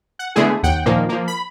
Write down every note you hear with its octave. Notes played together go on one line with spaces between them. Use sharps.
F#5
D3 G#3 A3 B3 E4 G#4
D#2 F#5 G5
A#2 D#3 F3 A#3
F3 A#3
B5